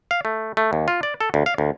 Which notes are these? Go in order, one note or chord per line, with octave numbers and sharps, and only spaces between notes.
F5
A3
A3
D#2
F4
D5
A4
D2
F5
D2